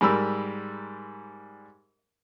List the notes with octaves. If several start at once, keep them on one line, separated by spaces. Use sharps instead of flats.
G#2 G3 A#4 B5 E6